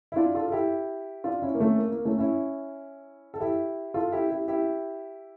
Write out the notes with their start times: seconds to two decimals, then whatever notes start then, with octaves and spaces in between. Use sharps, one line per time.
0.12 E4
0.16 D4 F4
0.35 F4 A4
0.48 A4
0.52 E4 G4
1.24 D4 F4
1.42 C#4 E4
1.54 A#3
1.60 A3 C#4
1.78 A#3
1.92 A#3
2.05 A3 C#4
2.19 C#4 E4
3.34 A4
3.40 E4 G4
3.94 F4 A4
4.12 E4 G4
4.30 E4 G4
4.48 E4 G4